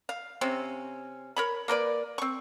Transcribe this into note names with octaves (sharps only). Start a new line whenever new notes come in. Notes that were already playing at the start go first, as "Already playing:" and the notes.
F5
C3 C4 C#4
A#4 C#5 B5
A#3 A#4 B4 D5
C4 C#6